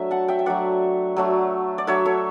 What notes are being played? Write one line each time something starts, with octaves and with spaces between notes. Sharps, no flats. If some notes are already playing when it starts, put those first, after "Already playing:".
Already playing: F#3 A3 D4 E5
F#5 A5
E5 G5
E5
F#3 A3 D4 D5 F#5
F#3 A3 D4
D5
F#3 A3 D4 C#5 E5
A4 C#5